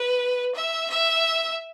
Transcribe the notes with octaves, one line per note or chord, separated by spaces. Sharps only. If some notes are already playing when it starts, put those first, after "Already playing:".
Already playing: B4
E5
E5